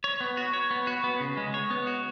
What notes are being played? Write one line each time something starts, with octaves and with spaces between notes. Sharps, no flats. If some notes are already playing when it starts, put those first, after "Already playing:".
C#5
B3
F#4
C#5
B3
F#4
B3
C#3
G#3
C#5
B3
F#4